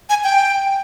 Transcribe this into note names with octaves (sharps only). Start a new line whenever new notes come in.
G#5
G5